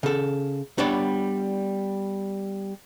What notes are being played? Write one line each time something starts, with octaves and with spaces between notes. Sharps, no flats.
C#3 A4
G3 B3 D4 C#5 D5